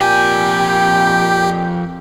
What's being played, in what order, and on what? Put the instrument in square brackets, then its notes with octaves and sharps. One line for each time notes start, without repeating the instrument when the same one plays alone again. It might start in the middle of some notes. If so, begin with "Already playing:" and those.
[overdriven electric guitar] F2 G#5 [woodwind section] A#2 G5 [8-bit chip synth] G4